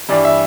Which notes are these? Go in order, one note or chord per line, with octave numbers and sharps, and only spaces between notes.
G2 E3 G3 D5
E5